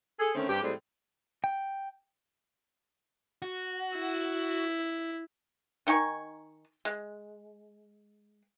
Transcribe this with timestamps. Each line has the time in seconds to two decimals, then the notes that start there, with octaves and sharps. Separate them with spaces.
0.19 G#4 A4
0.35 D3 D#3 A3 C4 C#4
0.48 G2 C4 G4
0.62 A2 F3 G3 G#3 C4
1.44 G5
3.42 F#4
3.95 E4
5.87 D#3 D#4 G#5 C#6
6.85 G#3